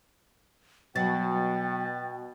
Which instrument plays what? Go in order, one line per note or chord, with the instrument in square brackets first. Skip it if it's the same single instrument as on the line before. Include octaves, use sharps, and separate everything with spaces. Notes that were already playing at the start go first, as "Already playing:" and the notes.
[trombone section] B2 [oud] F#3 [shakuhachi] G5 [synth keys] A6